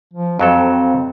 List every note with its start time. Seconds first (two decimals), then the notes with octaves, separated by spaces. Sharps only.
0.14 F3
0.39 F2 F#3 C4 A4